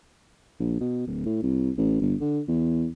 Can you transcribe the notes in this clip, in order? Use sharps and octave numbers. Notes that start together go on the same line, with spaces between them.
A#1
B2
D1
A2
C2
A1
G1
D3
E2